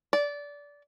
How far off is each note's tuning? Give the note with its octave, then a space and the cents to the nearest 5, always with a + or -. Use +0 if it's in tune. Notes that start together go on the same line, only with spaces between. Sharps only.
D5 -20